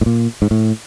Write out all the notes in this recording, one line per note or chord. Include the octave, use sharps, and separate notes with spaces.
A2
A#2
G#2
A2